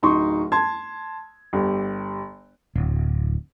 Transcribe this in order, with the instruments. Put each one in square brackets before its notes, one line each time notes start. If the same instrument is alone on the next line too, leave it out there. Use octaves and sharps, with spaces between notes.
[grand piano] D1 D#4 C6 C#6
A5 C6 G#6
G1 G4
[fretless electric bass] D1